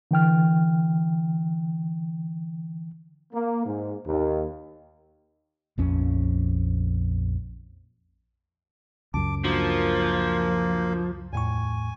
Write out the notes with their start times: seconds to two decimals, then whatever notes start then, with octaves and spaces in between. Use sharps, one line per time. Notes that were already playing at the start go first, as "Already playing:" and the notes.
0.11 D3 E3 G5 F6
3.33 A#3
3.65 G#2
4.06 D#2
5.78 A#1 F2 C#4
9.14 C#2 F#2 A5 D6
9.44 F3 A#3 D4 F#4 A#4
11.33 E2 A2 G#5 C#6